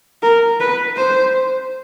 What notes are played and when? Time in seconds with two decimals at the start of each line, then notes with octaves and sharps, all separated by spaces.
0.23 A#4
0.60 B4
0.97 C5